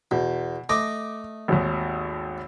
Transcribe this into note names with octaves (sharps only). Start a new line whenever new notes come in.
E2 B2
A3 D#5 D6
G#1 D#2